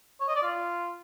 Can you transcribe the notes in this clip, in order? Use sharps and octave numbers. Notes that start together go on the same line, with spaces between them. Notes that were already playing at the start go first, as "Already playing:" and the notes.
C#5
D#5
D5
F4